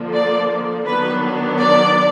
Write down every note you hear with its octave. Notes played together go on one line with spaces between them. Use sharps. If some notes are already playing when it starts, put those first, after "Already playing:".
Already playing: D3 F3 A#3
D5
D#3 F#3 B3 D4 B4
D5